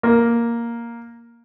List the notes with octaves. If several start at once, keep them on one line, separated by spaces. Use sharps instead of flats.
A#3